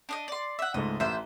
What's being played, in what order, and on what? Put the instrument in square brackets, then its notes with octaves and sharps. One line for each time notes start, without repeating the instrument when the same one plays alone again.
[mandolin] D4 D5 D#5
D5 C6
E5 F#5
[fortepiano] C#2 G#2 A3 [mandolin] D#5
[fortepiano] A1 C6 [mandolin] C5 E5